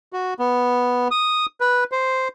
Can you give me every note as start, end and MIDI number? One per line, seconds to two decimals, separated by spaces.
0.13 0.34 66
0.39 1.08 59
1.11 1.46 87
1.60 1.84 71
1.92 2.28 72